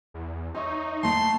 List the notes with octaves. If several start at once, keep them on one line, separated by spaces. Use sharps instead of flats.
E2
D#4 C#5 E5 C6
A3 A#3 A5 C6